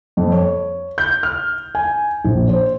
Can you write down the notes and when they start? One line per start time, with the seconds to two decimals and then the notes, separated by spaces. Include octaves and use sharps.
0.17 F2
0.32 C#5
0.98 G6
1.23 F6
1.75 G#5
2.25 A#1
2.49 C5